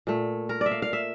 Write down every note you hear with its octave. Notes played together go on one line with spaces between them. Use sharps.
A#2 A3
A#4
D5 E5
F5
F5
E5